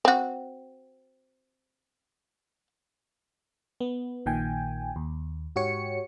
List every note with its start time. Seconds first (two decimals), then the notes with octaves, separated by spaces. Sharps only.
0.05 C4 F#4
3.80 B3
4.26 A#1 A#2 D#3 G5 G#5
4.96 D#2
5.56 G#2 F#4 G4 C#5 C#7